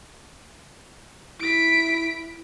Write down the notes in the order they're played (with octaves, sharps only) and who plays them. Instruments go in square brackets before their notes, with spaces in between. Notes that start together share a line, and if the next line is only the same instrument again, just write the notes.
[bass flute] E4 [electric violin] B6 D7